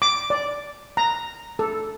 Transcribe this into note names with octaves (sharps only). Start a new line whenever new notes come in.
D6
D5
A#5
A4